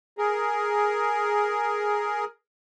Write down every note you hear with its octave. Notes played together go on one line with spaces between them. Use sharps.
G#4 A#4